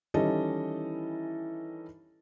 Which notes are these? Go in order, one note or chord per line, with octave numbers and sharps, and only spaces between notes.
D#3 E3 G3 C#4 A4 D#5